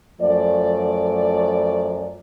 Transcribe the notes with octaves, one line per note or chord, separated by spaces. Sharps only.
F#2 F3 A3 D5